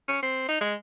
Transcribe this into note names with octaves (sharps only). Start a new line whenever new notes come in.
C#4
C4
D#4
G#3